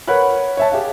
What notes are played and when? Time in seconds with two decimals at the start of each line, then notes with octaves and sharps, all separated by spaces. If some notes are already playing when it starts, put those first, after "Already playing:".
0.08 A#4 B4 C#5 F#5 B5 F#6
0.57 C#5 E5 A5
0.72 G4 G#4 E5 F5